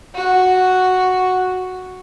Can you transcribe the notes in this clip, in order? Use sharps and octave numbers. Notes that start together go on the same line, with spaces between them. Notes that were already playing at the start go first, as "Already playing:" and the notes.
F#4